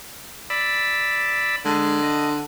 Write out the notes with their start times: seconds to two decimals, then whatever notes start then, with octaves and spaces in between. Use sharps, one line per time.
0.50 D5 B5 E6
1.65 D3 G#3
2.02 D#5